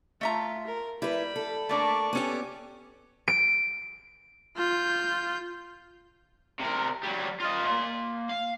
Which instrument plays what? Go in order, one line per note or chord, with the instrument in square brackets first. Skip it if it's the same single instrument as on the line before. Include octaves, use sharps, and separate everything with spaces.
[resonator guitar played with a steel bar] A3 E5 A#5 [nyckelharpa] F4
[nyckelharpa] A#4
[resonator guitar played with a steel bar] G3 [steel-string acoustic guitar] E4 B4 [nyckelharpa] B5
[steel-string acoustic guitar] A4
[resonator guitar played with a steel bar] A3 A#3 D4 [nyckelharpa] D5 C#6
[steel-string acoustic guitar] B3 C#4 G4 [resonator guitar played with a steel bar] A4 G#5
[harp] D7
[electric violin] F4 G6
[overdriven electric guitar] C3 A#4
F#3 G3
F4 D#5
A#3 C6
F5